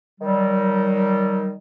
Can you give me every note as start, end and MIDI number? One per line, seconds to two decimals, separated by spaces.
0.20 1.51 51
0.20 1.51 54
0.20 1.51 55